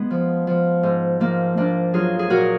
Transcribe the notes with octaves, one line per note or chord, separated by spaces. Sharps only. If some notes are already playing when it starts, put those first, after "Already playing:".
Already playing: G#3 B3
F3
F3
G#2
F3 A#3
G#2 A#3 D4
F#3 F4 G#4
G#4
A#2 F#4 A#4